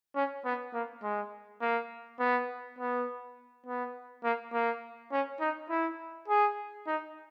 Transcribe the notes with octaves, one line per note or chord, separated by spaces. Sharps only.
C#4
B3
A#3
G#3
A#3
B3
B3
B3
A#3
A#3
C#4
D#4
E4
G#4
D#4